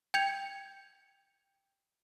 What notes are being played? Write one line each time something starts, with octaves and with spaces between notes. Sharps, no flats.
G5 G6 G#6 C#7 F7